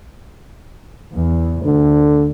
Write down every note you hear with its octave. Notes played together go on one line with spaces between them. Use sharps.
E2
D2 D3